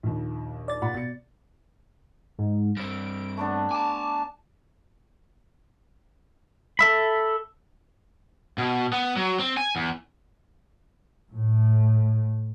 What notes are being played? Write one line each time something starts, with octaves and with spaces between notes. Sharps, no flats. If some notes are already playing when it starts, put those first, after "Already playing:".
A#1 D#2
D5 A6
A#2 F#5 B5
B2 A6 C#7
G#2
G2 C4 D7
A3 B3 D4
G#5 A5 D6
A4 E5 B5
B2
B3
F#3
C4
G#5
E2
A2